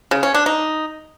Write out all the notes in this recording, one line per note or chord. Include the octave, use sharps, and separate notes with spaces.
C#3
C#4
D4
D#4